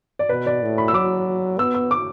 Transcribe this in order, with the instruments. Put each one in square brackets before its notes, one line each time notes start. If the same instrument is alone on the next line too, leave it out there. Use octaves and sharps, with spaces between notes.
[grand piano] D5
[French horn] B2 [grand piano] B4
[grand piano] D5
[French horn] A2
[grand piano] B5
E6
[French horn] F#3 [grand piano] D6
[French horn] B3 [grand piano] E6
[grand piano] E6
D6